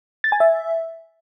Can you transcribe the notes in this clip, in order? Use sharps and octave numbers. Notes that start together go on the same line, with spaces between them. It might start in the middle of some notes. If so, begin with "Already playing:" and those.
A6
G#5
E5